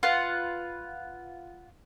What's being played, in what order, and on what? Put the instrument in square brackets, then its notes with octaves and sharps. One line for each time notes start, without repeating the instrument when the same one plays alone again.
[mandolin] F4 B4 F#5